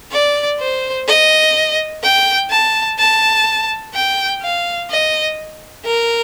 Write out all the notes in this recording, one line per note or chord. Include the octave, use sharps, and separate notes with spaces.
D5
C5
D#5
G5
A5
A5
G5
F5
D#5
A#4